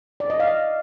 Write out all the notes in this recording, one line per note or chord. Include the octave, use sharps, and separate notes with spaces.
D5
D#5
F5